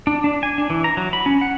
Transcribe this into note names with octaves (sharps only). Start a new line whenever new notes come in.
D4
D4
G#5
D4
E3
A#5
F#3
B5
C#4
F#5